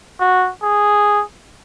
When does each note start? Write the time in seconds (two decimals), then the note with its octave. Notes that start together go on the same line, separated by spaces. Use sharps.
0.20 F#4
0.63 G#4